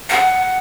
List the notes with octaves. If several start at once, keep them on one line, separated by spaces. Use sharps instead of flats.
F#5